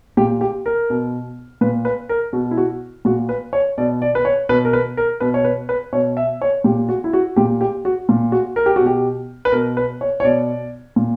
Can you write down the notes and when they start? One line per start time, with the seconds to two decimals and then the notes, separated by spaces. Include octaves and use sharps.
0.17 A#2 G4
0.41 G4
0.66 A#4
0.90 B2
1.61 A#2 B4
1.85 B4
2.09 A#4
2.33 B2 F#4
2.51 E4
2.57 F#4
3.05 A#2 F#4
3.29 B4
3.53 C#5
3.78 B2 D5
4.02 D5
4.15 B4
4.25 C#5
4.49 B2 B4
4.65 A#4
4.73 B4
4.97 A#4
5.20 B2 B4
5.34 C#5
5.44 B4
5.69 B4
5.93 B2 C#5
6.17 E5
6.42 C#5
6.64 A#2 G4
6.89 F#4
7.04 E4
7.13 F#4
7.36 A#2 G4
7.61 G4
7.85 F#4
8.09 A#2
8.32 F#4
8.56 A#4
8.66 G4
8.76 B2 F#4
8.86 G4
9.45 B4
9.52 B2 A#4
9.77 B4
10.01 C#5
10.20 C#5
10.24 B2 D5
10.96 A#2